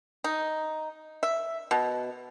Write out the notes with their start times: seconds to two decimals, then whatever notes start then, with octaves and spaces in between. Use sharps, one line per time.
0.24 D#4
1.23 E5
1.71 B2